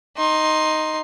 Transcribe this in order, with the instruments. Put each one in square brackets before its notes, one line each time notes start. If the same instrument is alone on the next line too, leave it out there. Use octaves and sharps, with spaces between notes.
[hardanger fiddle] D#4 C6